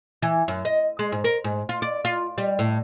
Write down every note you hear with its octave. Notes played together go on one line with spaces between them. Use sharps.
E3
F#2
D#5
G#3
G#2
A#4
G#2
F4
D5
F4
G3
A2